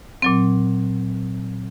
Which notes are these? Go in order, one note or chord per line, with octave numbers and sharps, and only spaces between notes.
A#2 F#3 C4